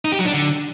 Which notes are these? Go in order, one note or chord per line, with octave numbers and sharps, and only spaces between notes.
D#4
G4
F#3
D4
D3